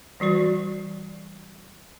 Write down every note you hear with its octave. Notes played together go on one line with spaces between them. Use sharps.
E3 G3 F#4 D5